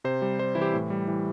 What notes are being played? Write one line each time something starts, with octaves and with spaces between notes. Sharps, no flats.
C3 C5
G3
G3 C5
E3 E4
G4
A2
G3
E3